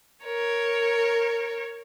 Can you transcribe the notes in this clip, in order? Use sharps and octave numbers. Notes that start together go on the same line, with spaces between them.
A#4 C#5